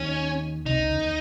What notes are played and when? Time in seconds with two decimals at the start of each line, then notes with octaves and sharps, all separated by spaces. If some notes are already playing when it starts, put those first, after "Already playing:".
Already playing: D#2 D#3 C#4
0.65 C2 C3 D#4
0.80 C#2 C#3
0.95 D#2 D#3